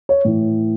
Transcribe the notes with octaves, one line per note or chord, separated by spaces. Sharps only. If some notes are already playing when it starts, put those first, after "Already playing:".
C#5
A2 E3